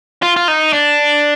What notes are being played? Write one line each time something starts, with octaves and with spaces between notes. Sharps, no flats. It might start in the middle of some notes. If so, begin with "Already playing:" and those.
F4
F4
D#4
D4